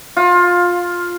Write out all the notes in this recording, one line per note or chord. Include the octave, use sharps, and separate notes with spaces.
F4